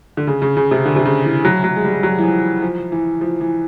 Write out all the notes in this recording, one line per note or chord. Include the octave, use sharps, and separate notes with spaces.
D3
C#3
C#3
C#3
C3
D3
C3
C#3
E3
F#3
F#3
G#3
G3
F#3
E3
F3
F3
E3
F3
E3